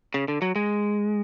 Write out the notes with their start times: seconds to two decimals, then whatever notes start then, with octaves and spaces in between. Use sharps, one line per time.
0.14 C#3
0.28 D3
0.42 F#3
0.56 G#3